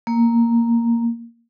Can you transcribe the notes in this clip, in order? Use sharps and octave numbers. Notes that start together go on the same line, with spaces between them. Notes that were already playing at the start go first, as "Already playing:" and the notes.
A#3